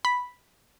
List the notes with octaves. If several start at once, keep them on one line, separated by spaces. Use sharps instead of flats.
B5